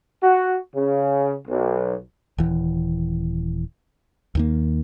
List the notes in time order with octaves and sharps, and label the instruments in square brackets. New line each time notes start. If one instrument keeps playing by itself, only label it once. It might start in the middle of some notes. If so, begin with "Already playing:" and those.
[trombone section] F#4
C#3
B1
[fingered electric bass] D#1 E3
D#2 D#3 A#3